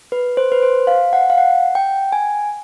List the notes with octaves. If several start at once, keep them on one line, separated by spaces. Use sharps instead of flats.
B4
C5
B4
C5
F5
F#5
F5
F#5
G5
G#5